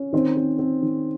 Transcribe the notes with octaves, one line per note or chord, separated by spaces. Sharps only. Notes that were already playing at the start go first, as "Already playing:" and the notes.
Already playing: C#4
D#3 C4 C5
C4
C4
D#3